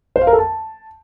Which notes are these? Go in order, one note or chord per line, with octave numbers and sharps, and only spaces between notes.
C5
F5
A#4
A4
A5